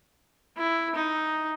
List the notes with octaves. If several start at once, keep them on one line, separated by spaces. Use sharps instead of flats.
E4
D#4